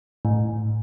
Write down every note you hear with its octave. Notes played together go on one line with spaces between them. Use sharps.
A2